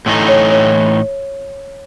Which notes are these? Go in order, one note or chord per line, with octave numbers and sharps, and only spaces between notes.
A2 E3 A3 D#4
C#5
C#5